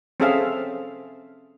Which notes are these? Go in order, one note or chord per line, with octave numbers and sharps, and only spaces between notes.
C4 C#4 G#4 A4 E5 F5